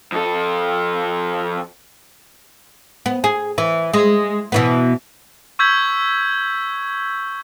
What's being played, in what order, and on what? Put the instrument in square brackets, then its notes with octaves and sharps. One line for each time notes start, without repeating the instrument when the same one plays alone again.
[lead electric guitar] F2 A4
[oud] B3
G#4
E3
G#3
B2 E3 B3
[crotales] C#6 E6 G6 G#6 B6 F#7